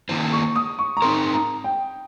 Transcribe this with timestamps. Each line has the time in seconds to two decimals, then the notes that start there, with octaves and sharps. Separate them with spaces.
0.09 D#3 A#3 F4 C5
0.32 C#6
0.56 D#6
0.79 C#6
0.97 A#5
1.02 C4 D#4 A#4 C6
1.34 A#5
1.64 G5